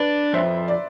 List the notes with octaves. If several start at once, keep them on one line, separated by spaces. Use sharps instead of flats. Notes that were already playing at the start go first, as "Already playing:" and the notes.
Already playing: D4 B4 D5
F2 C5 E5
D5